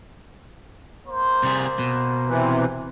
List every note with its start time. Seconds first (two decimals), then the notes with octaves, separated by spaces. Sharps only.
1.06 A#3 C5
1.43 C3 G3 G#4
1.79 B2
2.28 C3 E3